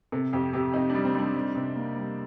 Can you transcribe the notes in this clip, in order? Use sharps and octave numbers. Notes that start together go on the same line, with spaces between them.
C3 A4
F2 G4
C3 G4
F2 D#4
D4
G3
C4
G3 D4
G3
C3
A#3
G3